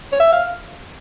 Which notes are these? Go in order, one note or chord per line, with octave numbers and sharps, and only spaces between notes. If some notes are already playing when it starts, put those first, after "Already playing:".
C#5
E5
F5